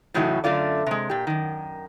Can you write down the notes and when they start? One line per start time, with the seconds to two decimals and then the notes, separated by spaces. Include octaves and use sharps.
0.14 A2 C#3 E3 F#3 A3 D#4
0.44 F#2 D3 A3 F4 D5
0.86 C3 G#3
1.10 A#2 G4
1.27 F#2 D#3